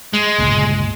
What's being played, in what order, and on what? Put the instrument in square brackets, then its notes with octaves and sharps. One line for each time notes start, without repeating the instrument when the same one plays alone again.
[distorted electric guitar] G#3
[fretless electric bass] G1 C#2 A#2